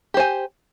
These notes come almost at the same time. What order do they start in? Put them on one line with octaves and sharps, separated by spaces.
G4 C5 G#5